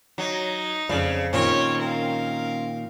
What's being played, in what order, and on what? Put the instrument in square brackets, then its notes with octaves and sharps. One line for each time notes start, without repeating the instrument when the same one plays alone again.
[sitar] F#3 [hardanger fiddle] D#4
[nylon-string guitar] F2 D5 F5 [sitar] C#3
[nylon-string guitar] A#2 D#3 [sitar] C4 C#4 [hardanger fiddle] C#5
[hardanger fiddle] A#4 F5